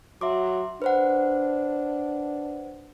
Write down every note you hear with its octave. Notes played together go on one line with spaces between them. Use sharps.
F#3 E5 C6 D6
D4 B4 C5 F#5